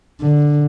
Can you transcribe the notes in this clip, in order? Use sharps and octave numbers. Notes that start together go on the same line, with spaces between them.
D3